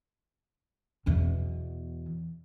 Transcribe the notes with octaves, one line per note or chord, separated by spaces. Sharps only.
E2 B2